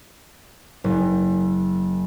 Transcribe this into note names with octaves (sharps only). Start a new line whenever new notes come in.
F#1